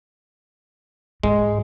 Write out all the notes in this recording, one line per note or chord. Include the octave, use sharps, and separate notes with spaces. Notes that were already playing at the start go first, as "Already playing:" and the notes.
G#2 G#3